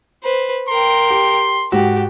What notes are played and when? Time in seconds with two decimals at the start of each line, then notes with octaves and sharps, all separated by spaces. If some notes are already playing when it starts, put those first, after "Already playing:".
0.23 B4 C5
0.68 A#4 G5 C6
1.10 G4
1.72 G#2 F#4 G4